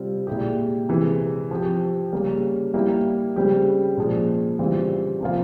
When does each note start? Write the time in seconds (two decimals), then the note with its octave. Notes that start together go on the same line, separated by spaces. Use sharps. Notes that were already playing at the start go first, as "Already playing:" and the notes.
Already playing: C3 G3 C4 F4
0.27 A#2 G#3 E4 G4
0.89 C3 E3 G#3
1.51 F3 C4 G4
2.13 C#3 G3 A#3 C#4
2.74 G3 A#3 E4 G4
3.36 C#3 G3 C4 G4
3.98 A#2 F3 G#3
4.59 C#3 E3 G3 C4 F4
5.21 C3 F3 A#3 F4